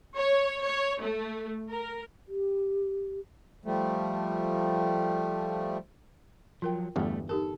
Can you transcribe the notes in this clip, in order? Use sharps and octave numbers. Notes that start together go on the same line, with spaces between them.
C#5
C#5
A3
A#4
G4
F3 G3 A3
F3 F#3 F4 A#4 G5
G1 E2 G2 G3 A3
D#4 G4 A4 A#4